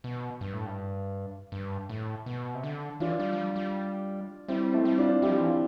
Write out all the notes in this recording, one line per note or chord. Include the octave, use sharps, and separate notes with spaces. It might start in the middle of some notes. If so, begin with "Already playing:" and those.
B2
G2
A2
G2
G2
A2
B2
C3
D3
E3 D4 F4
G3
F3
G3
G3
G3 C4 E4
A3 C4 E4
G3
D4 F4
G3 E4 G4
F3
E3
F3